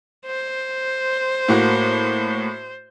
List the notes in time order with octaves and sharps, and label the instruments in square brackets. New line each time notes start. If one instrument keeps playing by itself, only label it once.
[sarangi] C5
[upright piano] A2 A#3 F#4